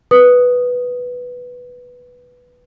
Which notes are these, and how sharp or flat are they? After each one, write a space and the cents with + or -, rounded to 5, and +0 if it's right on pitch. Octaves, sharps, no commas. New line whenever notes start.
B4 +0 D#6 +0